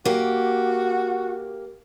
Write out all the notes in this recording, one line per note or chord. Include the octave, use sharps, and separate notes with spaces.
A#3 F#4 G4